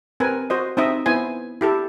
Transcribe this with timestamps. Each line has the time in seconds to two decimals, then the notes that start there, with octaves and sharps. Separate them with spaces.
0.20 C4 A#4 B4 G#5
0.50 F#4 C5 D#5
0.77 C4 D#4 D#5 E5
1.06 B3 E4 C5 G#5
1.61 E4 G4 A4